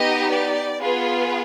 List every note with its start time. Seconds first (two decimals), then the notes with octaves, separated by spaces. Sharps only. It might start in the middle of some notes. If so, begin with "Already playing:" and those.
Already playing: B3 D#4 G4 D#5
0.31 D5
0.81 B3 F4 G#4 B4